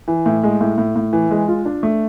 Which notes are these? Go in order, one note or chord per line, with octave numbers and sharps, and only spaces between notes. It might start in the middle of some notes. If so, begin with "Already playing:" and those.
E3
A2
G#3
A2
A2
A2
E3
G#3
F4
D4
A3